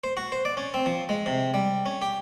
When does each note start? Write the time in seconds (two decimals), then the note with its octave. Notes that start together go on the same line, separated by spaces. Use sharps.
0.04 C5
0.17 F#4
0.32 C5
0.45 D5
0.57 C#4
0.74 C4
0.86 F3
1.09 G#3
1.26 C3
1.54 G3
1.86 C#4
2.02 G4